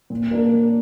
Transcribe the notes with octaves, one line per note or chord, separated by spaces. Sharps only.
A#2
A#3 D4 A#4
A#2